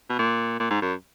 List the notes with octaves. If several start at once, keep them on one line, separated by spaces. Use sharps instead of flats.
B2
A#2
A#2
G#2
F#2